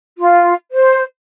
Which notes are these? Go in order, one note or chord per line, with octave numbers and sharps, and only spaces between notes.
F4
C5